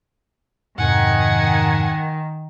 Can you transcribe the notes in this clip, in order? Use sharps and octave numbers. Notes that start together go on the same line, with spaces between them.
F2 G#2 C3 D#3 F#5 G#5